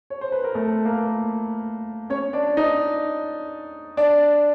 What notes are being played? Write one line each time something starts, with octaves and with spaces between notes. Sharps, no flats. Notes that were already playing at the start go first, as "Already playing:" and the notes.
C#5
C5
B4
A#4
A3 A4
A#3 A#4
C#4 C#5
D4 D5
D#4 D#5
D4 D5